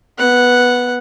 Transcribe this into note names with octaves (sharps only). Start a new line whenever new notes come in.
B3 F#5